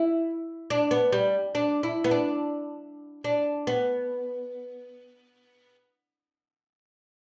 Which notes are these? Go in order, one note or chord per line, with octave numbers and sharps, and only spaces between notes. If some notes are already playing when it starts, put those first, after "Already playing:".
Already playing: E4
D4
B3
G3
D4
E4
B3
D4
D4
B3